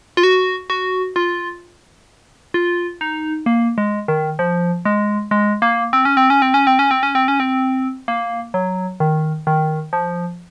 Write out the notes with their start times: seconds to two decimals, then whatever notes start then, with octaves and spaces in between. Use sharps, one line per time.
0.17 F4
0.23 F#4
0.70 F#4
1.16 F4
2.54 F4
3.01 D#4
3.46 A#3
3.78 G#3
4.08 D#3
4.39 F3
4.85 G#3
5.31 G#3
5.62 A#3
5.93 C4
6.05 C#4
6.17 C4
6.30 C#4
6.42 C4
6.54 C#4
6.67 C4
6.79 C#4
6.91 C4
7.03 C#4
7.15 C4
7.28 C#4
7.40 C4
8.08 A#3
8.54 F#3
9.00 D#3
9.47 D#3
9.93 F3